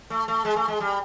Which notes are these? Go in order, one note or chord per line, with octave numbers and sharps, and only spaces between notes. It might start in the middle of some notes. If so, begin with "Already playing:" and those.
A3
A3
G#3
A3
G#3
G3